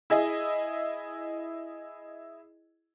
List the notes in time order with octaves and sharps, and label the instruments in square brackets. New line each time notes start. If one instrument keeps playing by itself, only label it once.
[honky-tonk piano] E4 G#4 D#5